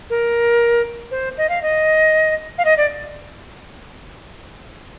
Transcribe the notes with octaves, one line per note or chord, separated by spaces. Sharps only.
A#4
C5
D#5
F5
D#5
F5
D#5
D5